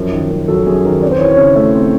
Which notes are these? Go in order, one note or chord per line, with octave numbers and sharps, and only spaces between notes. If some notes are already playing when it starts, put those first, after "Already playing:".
Already playing: F#2 F3
D#3
F#2
F#3 A4
F#2 G#4
D#3 A#4
C4 D5
C5
C#5
E3
C#5
C#3
A3
C4